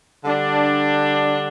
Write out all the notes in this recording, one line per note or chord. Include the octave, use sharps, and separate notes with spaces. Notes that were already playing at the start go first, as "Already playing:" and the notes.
D3 G3 D4